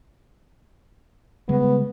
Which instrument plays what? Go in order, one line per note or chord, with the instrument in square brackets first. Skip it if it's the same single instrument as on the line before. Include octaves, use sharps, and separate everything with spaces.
[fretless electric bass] C#3 G3 G#3 [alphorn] B3